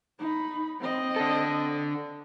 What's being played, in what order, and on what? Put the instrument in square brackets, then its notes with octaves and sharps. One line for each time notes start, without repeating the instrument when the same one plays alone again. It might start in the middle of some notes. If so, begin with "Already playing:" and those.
[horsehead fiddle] D#4 B5
C4 D#5
[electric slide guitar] D4 A4